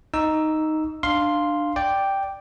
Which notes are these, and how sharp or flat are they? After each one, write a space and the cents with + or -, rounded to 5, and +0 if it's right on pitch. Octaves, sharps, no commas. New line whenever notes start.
D#4 +0 C#6 +40 E6 +0
D4 +20 F5 +0 C6 +0
D5 +0 G5 +0